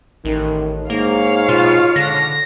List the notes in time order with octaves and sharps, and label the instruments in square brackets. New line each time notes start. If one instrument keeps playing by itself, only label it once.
[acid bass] A1 [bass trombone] D#3
[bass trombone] G#2 [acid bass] A#3 [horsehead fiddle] C#5 F5
[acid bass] B2 [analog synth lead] F4
[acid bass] D3 [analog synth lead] A#6